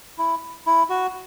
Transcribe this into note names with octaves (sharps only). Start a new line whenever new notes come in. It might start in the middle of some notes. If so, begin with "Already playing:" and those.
E4
E4
F#4